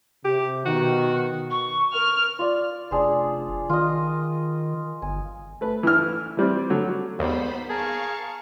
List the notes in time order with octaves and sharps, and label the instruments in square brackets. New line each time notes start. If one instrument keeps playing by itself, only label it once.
[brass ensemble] C3 [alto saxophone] G4
[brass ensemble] B2 D#3 [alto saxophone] F#4
[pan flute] C#6
[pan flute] A#4 [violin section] F6
[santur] F4 D5
[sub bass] F1 [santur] D4 G#4 C5
[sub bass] D#3 [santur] F4 D#5
[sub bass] G1 [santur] G#5
[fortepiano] A3 B4
E3 F6
E3 G3 C4
D3 F#3
[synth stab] D#2 [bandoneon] G#2 G3 [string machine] B3 C5 B5
[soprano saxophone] G#4 [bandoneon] A#4 A5 [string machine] F5 C#6